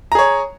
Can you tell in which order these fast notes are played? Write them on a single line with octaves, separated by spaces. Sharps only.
A#5 G#4 C#5